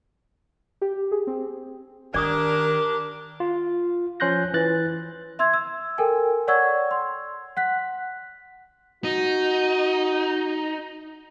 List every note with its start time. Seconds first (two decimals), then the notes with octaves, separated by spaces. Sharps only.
0.82 G4
1.12 G#4
1.27 C4
2.14 D#3 D4 G4 A#4 D5 D6 D#6
3.40 F4
4.20 F3 C#4 C6 F#6 G6 A#6
4.54 E3 F#6 A6
5.39 E5 C6 E6 G#6
5.53 E6
5.98 A4 A#4 G5 G#5
6.48 C#5 D5 F#5 C#6 E6 G#6
6.91 C6
7.57 F#5 F#6 B6
9.04 D#4 F#4